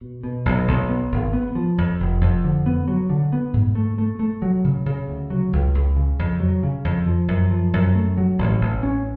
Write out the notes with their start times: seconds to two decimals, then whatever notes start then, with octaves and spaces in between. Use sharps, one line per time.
0.01 B2
0.23 B2
0.46 B1
0.67 B1
0.89 B3
1.12 G#1
1.33 B3
1.55 F3
1.78 F2
2.00 F1
2.21 F2
2.44 D3
2.66 B3
2.88 F#3
3.10 D3
3.32 B3
3.53 G#2
3.75 A3
3.98 A3
4.19 A3
4.42 F#3
4.64 C#3
4.86 C#3
5.08 D2
5.30 F#3
5.53 C#2
5.75 C#2
5.96 C#3
6.19 F2
6.40 F#3
6.63 C#3
6.85 F2
7.06 F3
7.28 F#2
7.51 F3
7.73 F#2
7.95 A3
8.17 F#3
8.38 A1
8.61 A1
8.83 C#4